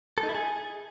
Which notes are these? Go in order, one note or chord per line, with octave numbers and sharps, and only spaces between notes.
A4
D#4
E4
G#4